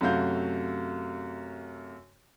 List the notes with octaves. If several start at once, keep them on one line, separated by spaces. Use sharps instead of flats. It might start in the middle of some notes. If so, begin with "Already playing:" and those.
F#2 C3 A3 F#4 F5 G6